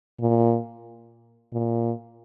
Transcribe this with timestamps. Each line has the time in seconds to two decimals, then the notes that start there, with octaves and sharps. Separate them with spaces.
0.20 A#2
1.53 A#2